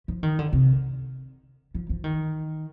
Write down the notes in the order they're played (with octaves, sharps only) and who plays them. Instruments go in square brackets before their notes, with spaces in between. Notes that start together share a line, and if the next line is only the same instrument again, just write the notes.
[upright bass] F3
D#3
D3
C3
F3
F3
D#3